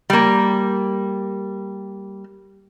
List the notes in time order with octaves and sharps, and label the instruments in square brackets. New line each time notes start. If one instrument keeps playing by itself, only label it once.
[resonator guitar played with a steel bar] G3 A#3